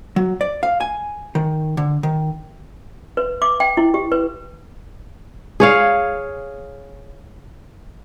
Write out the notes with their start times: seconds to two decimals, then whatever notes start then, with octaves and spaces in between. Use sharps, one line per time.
0.16 F#3
0.41 D5
0.63 F5
0.80 G#5
1.35 D#3
1.77 D3
2.03 D#3
3.17 B4
3.42 D6
3.60 G5
3.77 E4
3.94 G4
4.12 B4
5.60 G#4 C#5 F5